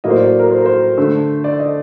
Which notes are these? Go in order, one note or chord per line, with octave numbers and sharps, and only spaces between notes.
A2 F#3 A#3 D#5
C5
D5
A#4
C5
A#4
C5
D3 A3
D5
D#5